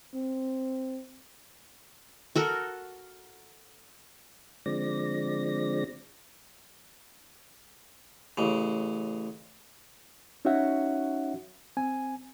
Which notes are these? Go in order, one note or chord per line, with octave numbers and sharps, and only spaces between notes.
C4
F#4 A4 A#4
D3 F3 G#3 C4 D5 A#6
A1 C#3
C#4 D#4 F#4 C#5 E5 F#5
C4 G#5